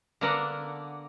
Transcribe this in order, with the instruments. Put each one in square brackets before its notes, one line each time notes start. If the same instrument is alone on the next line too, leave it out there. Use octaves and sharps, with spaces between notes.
[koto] D3 A#3 B3 D4 A#4 F#5